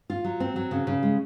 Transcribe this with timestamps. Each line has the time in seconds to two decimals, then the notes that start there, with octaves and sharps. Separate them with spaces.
0.10 F4
0.24 F#3
0.40 C4
0.56 F#3
0.71 C#3
0.87 C#3
1.03 G#3